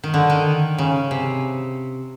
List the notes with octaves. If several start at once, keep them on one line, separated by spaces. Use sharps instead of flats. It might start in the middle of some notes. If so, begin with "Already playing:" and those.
D#3
D3
D#3
C#3
C3